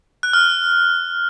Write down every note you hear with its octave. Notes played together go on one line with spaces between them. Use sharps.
F#6
F6